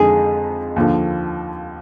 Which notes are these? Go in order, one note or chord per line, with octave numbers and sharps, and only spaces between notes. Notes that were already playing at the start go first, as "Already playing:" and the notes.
Already playing: F2 D3 G#3 D#4 G#4
D#2 D3 F3